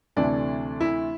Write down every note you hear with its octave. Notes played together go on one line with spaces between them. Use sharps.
D2 C3 E3 A3 D4
E4